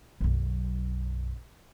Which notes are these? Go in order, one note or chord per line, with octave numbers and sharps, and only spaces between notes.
B1 F#2